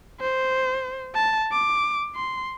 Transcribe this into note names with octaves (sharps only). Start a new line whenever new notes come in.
C5
A5
D6
C6